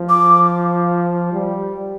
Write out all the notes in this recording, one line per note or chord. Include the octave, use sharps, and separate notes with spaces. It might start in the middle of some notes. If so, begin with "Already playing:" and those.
Already playing: F3
D6
G3